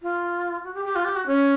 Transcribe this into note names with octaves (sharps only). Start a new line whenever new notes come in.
F4
F#4
G4
G4
F4
G4
F#4
C#4